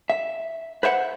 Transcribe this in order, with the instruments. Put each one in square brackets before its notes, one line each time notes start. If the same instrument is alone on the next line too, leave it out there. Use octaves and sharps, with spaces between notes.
[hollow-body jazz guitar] E5
B4 C5 E5 F#5